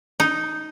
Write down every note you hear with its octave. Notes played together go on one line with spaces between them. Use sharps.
D#4